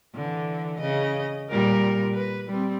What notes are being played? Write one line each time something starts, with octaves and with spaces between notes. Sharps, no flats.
D3 E3
C#3 D#5
A#2 G3 A#4
B4
G3 C4